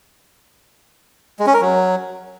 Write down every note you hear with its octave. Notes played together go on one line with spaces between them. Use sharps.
G#3
C#4
A#4
F#3